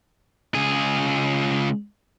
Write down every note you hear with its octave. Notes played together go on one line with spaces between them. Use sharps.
C#2 G#4